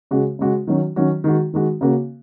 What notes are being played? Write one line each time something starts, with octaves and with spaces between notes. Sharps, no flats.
C#3 G#3 F#4
C#3 G#3 F#4
D#3 F#3 C#4 F#4
D#3 F#3 C#4 F#4
D#3 G#3 F#4
D#3 G#3 F#4
C#3 A#3 F#4